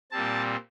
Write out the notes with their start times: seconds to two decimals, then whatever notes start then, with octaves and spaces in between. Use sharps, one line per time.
0.11 A#2 G3 C4 A5